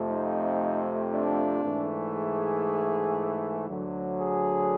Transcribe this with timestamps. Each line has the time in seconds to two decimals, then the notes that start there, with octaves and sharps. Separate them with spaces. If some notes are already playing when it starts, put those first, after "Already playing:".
Already playing: F2 C3 F3 A3
0.09 D#4
1.11 D4
1.63 G#2 E3 A3
2.14 G#4
3.68 D2 D3 F#3
4.19 G#4